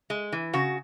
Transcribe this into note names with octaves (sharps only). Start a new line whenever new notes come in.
G#3
E3
C#3 F#4